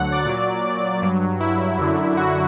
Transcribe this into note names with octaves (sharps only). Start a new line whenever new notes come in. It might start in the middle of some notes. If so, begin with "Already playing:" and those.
Already playing: D2 D3 F#3 F#5
D5
A#2 F#3 D5
G2 F#3
E4
F#2 D3 F#3
F#4